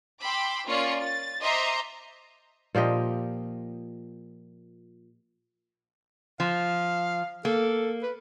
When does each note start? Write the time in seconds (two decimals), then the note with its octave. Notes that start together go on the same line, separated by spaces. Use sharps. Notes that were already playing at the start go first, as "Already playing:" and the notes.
0.21 G5 B5 C6 D6 E6
0.67 A#3 C#4 F4 D5 C#7
1.02 A6
1.41 C5 D#5 E5 A#5 C6 D6
2.75 A#2 F3 G4 D#5
6.40 F3 F5
7.45 A#3 A4
8.03 B4